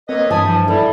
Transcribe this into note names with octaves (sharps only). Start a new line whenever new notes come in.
A#3 C4 B4 C#5 D#5
G2 E3 G#5 A5 B5 D#6
F3
G3 E4 A4